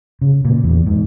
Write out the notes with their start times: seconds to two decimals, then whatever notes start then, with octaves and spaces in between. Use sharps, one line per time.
0.21 C#3
0.45 A#2
0.64 E2
0.86 G#2